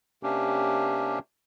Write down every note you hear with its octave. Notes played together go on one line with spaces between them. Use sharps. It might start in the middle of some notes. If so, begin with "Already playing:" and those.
C3 A#3 C#4 D4 G4